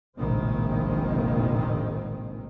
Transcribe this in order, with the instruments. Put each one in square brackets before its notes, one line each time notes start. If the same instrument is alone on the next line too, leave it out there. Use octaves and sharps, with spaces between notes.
[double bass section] F1 A#1 A2 D#3 G#3 C4